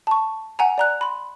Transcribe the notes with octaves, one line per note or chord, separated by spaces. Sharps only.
A5 C#6
F#5 G#5 A#5
D5 A#5 F#6
B5 C6